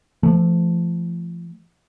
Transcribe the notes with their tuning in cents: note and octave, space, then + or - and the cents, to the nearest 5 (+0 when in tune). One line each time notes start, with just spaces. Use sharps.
F3 -30 A3 +0